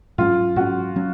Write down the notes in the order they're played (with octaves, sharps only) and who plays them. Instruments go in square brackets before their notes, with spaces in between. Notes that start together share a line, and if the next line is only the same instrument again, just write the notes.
[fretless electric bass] G#2 F#3 C#4 [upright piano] F4
[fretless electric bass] G#2 F#3 C#4 [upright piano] F#4
[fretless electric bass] F#3 C#4